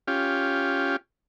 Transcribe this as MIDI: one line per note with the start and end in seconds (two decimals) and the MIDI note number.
0.07 0.96 61
0.07 0.96 65
0.07 0.96 67